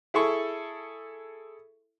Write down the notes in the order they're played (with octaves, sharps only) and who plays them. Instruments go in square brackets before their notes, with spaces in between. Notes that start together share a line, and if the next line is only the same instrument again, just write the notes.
[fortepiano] E4 G#4 A4 C#6